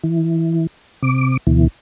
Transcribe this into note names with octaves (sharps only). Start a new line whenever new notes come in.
E3
C3 D6
D2 B2 E3